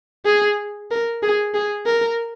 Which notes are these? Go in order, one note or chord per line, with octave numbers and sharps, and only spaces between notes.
G#4
A#4
G#4
G#4
A#4